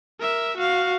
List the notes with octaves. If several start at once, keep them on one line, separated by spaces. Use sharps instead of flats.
A#4 E5
F#4 F5